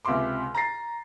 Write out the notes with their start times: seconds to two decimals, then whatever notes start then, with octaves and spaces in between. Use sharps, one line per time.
0.05 C#2 C3 E5 C6 D6
0.55 A#5 A6 A#6 C7